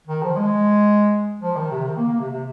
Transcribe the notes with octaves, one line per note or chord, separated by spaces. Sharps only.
D#3
F3
G#3
F3
D#3
C3
D#3
A#3
A#3
C3
C3